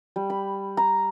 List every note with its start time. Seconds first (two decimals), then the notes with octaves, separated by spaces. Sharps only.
0.16 G3
0.30 B5
0.77 A#5